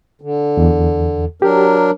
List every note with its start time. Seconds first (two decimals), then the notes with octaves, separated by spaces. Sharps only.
0.21 D3
0.57 E2
1.42 F#3 D4 G4 A#4